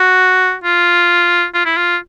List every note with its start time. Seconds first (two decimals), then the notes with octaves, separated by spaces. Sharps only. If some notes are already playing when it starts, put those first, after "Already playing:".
Already playing: F#4
0.64 F4
1.54 F4
1.65 E4
1.77 F4